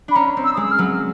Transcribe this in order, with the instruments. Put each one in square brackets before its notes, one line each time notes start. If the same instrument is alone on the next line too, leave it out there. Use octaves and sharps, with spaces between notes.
[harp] D4 [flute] B5
[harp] C#4 [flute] A#5
[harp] C4
[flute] E6
[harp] G#3 [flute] D#6
[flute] E6
F6
[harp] F#3